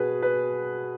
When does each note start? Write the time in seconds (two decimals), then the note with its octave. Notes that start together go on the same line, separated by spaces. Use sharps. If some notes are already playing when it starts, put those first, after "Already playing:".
Already playing: B2 G#4 B4
0.22 B4